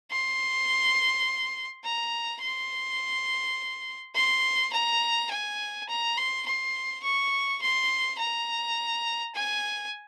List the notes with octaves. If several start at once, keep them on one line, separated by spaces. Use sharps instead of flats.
C6
A#5
C6
C6
A#5
G#5
A#5
C6
C6
C#6
C6
A#5
G#5